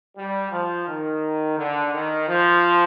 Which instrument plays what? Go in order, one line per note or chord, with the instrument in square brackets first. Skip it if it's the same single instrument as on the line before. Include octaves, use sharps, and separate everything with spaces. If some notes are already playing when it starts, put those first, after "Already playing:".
[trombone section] G3
F3
D#3
D3
D#3
F3